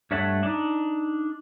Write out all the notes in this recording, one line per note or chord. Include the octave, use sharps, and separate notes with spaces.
G2 A3 C#5 E5 F#5 A5
D4 D#4